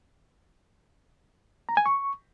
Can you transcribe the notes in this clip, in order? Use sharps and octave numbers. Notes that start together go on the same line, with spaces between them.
A#5
G#5
C#6